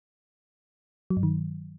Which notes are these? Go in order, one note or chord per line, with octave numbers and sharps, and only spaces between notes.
F#3
G2
D#3